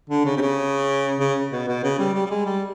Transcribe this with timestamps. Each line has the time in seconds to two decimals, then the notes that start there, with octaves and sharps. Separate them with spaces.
0.09 D3
0.25 C#3
0.37 C3
0.41 C#3
1.20 C#3
1.51 B2
1.68 B2
1.84 C#3
1.99 G3
2.14 G3
2.26 G3
2.30 G#3
2.46 G3